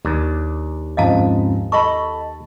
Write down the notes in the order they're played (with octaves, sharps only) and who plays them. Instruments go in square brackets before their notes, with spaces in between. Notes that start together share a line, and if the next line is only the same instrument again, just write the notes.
[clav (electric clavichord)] D#2 [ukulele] D4
[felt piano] F2 G#2 C#3 [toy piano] D#5 F5 A5
[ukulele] A4 D#5 B5 [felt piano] A5 [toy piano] C#6